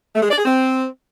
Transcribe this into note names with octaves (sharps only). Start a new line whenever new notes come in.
A3
G#3
D5
G#4
C4